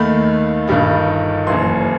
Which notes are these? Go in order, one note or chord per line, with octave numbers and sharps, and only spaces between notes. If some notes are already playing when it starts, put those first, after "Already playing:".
Already playing: D#2 D#3 A3 B5
G1 G2 D#3 G3 D#4
F#1 F#2 E3 C6